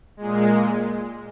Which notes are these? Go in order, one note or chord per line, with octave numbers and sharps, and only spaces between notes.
A#2 G#3